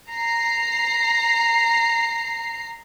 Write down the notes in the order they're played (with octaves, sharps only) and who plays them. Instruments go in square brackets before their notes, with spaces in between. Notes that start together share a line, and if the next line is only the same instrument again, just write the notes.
[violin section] A#5 C7